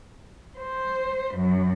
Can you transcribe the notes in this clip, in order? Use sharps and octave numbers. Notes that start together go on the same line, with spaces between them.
C5
F#2